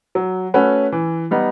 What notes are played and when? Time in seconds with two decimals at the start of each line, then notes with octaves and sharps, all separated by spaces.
0.15 F#3
0.54 A3 C#4 F#4 B4
0.92 E3
1.31 G3 B3 D#4